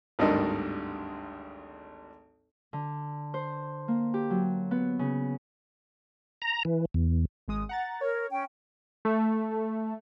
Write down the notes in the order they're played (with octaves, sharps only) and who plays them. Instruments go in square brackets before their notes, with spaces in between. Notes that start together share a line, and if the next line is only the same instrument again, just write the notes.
[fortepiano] G#1 D2 G2 D4 D#4 A#4
[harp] D3
C5
A#3
G4
F#3
B3
C#3
[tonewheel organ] A#5
E3
E2
[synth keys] G#1 G#3 D#6
F#5 A#5 A6
[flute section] A#4 [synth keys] C#5
[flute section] C#4 G5
[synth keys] A3